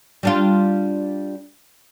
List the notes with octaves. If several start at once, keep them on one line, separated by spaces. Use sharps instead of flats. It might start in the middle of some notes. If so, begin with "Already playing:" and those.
G3 D4 F4